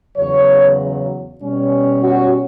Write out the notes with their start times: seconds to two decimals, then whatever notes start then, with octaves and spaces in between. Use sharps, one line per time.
0.16 E2 C#3 F#3 C#5
1.40 B2 G3 C#4
2.03 F#4